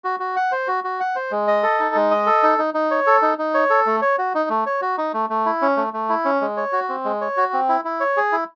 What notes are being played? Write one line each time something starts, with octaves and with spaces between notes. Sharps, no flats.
F#4
F#4
F#5
C5
F#4
F#4
F#5
C5
G#3
D#5
A4
D#4
G#3
D#5
A4
D#4
D#4
D#4
C#5
A4
D#4
D#4
C#5
A4
A3
C#5
F#4
D#4
A3
C#5
F#4
D#4
A3
A3
E4
C#4
A3
A3
E4
C#4
G#3
C#5
F#4
C4
G#3
C#5
F#4
C4
E4
E4
C#5
G#4
E4